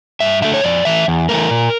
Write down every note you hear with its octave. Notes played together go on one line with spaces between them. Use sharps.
G2 E5
D3 A3 E5
C#5
F2 D5
E3 A3 E5
E2
E3 A3 A#4
A#2